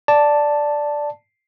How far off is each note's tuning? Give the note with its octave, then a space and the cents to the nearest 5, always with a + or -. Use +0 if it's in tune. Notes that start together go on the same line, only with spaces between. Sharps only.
D5 +0 A5 +0